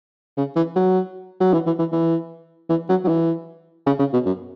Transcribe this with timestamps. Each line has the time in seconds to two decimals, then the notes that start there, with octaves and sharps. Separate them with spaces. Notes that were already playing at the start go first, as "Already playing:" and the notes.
0.37 C#3
0.56 E3
0.76 F#3
1.41 F#3
1.54 E3
1.67 E3
1.79 E3
1.92 E3
2.69 E3
2.89 F#3
3.05 F#3
3.08 E3
3.87 C#3
3.99 C#3
4.13 B2
4.26 F#2